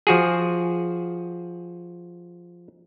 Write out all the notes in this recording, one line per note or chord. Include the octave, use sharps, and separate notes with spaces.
F3 F#4 G#4